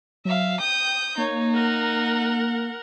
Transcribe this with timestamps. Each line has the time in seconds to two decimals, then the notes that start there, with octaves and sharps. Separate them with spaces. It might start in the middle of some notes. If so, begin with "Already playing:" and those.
0.25 F#3 E5 F5
0.60 G5 D#6 G6
1.18 A#3 D#4 C#5
1.54 A#4 F#5